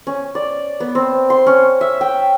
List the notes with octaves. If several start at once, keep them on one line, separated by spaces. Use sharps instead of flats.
C#4
D5
B3
C4
C6
C#4
E5
G5